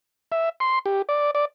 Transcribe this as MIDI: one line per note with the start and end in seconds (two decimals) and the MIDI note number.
0.32 0.49 76
0.60 0.79 84
0.86 1.02 67
1.09 1.31 74
1.35 1.45 74